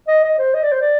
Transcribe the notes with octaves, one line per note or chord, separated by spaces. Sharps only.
D#5
D#5
C5
D#5
D5
C5
D5